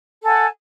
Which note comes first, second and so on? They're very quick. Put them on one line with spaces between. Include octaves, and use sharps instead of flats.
A4 G#5 F#5